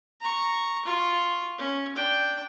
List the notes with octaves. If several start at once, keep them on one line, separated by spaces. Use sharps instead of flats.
A#5 C#6
F4 C#6
C#4
D4 G5